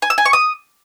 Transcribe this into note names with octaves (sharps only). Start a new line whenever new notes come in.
G#5
E6
G#5
C#6
D#6